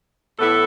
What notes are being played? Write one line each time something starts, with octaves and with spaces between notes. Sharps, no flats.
A2 E3 B3 E4 A4